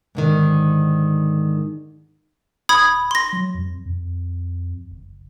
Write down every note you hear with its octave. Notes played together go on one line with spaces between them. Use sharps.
G#2 D3 D#3
D1 B5 D#6 G#6
C6 A#6
F#3
F2
F2
F#1